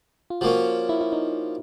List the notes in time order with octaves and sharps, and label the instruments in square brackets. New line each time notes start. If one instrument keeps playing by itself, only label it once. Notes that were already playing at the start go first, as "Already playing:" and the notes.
[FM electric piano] F4
[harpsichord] F3 A#3 C#4 [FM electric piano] F#4
[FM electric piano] E4
E4
D#4